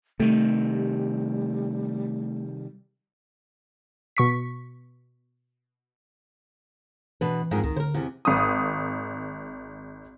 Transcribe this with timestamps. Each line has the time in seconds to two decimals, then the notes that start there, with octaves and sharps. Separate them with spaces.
0.20 C3 D#3 G3 A3
4.17 B2 C#6 B6
7.21 B2 E3 D4 B4
7.51 F2 G#2 D#3
7.63 C#2 D#3
7.76 D3 A#4 C5
7.94 E2 C3
8.25 G#1 D#6